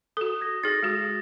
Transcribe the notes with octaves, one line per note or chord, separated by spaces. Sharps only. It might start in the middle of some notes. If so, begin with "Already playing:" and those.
F#4 A4 D#6
G#6 A#6
D#4 G#4 A6 A#6
G#3 F#4